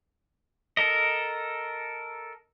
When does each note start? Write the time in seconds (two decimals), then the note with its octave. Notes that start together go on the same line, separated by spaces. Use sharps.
0.77 A4 A#4 D#5